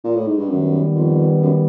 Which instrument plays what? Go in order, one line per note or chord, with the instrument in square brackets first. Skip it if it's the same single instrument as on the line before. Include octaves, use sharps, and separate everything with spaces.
[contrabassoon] A#2
A2
G#2
G2
[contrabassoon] F#2 [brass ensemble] D#3 G3 B3
[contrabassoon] F2
F#2